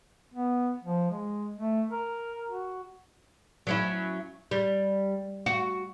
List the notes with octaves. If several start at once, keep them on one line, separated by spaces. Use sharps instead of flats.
B3
F3
G#3
A3
A#4
F#4
F#3 C#4 E4
G3
F#4